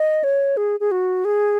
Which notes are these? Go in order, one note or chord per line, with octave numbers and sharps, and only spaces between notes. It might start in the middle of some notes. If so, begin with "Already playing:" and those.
Already playing: D#5
C#5
G#4
G#4
F#4
G#4